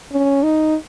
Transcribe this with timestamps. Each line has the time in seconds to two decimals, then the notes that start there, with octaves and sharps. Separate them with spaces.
0.12 C#4
0.43 D#4